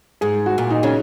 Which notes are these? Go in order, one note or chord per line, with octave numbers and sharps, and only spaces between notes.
G#2 G#4
F#4
A#2
D#4
C#3 C#4